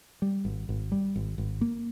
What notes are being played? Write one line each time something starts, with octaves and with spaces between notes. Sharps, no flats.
G3
G#1
G#1
G3
G#1
G#1
A#3